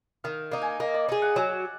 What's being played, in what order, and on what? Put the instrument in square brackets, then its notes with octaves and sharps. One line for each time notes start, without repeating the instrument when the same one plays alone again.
[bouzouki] D#3 [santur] F5
[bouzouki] A#3 D#4
[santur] G#5
[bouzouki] A#3 [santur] D#5
[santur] D5
[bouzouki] D#4 G#4
[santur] F#5
[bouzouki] F#3 [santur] G#5